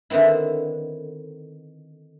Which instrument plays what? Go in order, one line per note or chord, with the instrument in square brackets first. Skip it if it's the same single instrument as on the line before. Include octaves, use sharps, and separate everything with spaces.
[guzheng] D3 D#3 B3 C4 E4